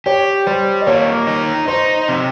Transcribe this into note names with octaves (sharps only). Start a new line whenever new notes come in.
G4 C#5
G3 C5
D#5
A#3 C#5
D#4
D#4 C5
C3